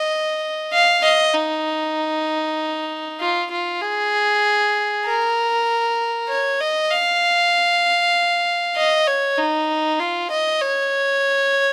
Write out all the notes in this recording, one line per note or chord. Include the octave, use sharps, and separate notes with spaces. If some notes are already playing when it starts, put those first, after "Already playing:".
Already playing: D#5
F5
D#5
D#4
F4
F4
G#4
A#4
C#5
D#5
F5
D#5
C#5
D#4
F4
D#5
C#5